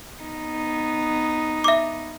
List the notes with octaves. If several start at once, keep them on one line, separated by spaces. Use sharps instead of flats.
B3 D#4
E5 D6